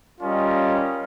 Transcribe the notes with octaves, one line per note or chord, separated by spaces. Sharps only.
G3 C#4 F4 A#4 D#5